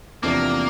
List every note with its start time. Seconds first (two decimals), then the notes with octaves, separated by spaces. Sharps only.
0.23 E2 C3 F3 A3 A#3 D4